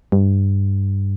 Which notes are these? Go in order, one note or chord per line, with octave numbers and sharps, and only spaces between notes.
G2